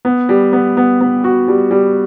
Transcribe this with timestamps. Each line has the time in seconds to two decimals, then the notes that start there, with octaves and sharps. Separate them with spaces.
0.05 B3
0.29 G3
0.53 B3
0.77 B3
1.01 B3
1.24 F#4
1.48 G3
1.71 G3